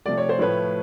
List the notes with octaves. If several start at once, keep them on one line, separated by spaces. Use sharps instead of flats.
C3 F3 A3 D5
C#5
C5
A2 F3 A3 B4 C#5